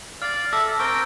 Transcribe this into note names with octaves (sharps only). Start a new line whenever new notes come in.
D5 F5 F6 A6
A4 E5 D6 E6 A#6
C4 A#4 G5 C#6